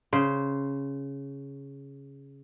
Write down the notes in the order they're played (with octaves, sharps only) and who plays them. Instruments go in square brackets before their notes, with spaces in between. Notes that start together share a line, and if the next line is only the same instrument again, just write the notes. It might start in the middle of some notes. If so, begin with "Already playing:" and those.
[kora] C#3 C5